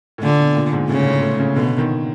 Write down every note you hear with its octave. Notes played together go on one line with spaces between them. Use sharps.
A2
A#2 D3
B2
A#2
G#2
A2 C#3
A2
A2
C#3
B2 D3
D#3